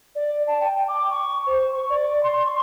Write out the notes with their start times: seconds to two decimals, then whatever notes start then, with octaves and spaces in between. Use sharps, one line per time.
0.15 D5
0.47 A5
0.60 G5
0.88 D6
1.10 C#6
1.46 C5
1.73 C#6
1.89 D5
2.23 C6
2.45 C#6